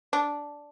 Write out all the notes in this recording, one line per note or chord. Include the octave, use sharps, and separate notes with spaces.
D4